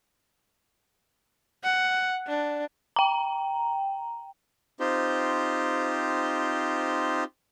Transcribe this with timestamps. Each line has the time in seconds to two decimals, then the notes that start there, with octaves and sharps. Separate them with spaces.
1.63 F#5
2.27 D4
2.96 G5 A#5
4.80 C4 D#4 F4 G4 C5